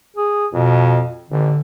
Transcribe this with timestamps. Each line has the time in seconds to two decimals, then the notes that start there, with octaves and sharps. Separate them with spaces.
0.16 G#4
0.53 F2 B2
1.30 A1 D3